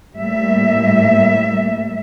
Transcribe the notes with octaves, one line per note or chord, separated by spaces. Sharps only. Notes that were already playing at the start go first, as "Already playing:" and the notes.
A2 G3 A#3 E5